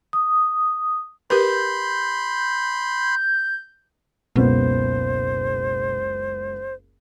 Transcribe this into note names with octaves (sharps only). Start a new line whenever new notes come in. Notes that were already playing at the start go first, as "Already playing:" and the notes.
D#6
G4 A#4 B4 B5 C6 G6
F#1 C#2 B2 B3 C5